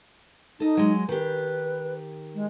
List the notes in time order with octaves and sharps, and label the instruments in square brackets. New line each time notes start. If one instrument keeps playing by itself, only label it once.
[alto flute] D#4 [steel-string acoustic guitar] A4 D#5
[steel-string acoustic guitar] F#3 G#3
[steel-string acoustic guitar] D#3 G4 [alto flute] B4
[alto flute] G#3